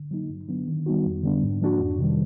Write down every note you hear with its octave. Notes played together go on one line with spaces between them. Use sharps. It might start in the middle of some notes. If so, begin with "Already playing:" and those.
Already playing: D3
F#3 A#3 D#4
G2
D3 F#3 B3 D4
D#3
G3 B3 D#4 F#4
F2
D3 G3 B3 D4
G#2
F3 A#3 D4 F#4
F2
C3 D#3 G3